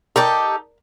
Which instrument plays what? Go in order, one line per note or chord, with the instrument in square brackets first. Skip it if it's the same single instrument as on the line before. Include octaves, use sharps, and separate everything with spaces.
[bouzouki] D#4 G4 A4 [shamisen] A#4 D5